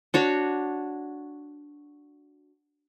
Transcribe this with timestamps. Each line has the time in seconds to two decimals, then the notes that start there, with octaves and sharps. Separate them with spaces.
0.14 D4 F#4 C#5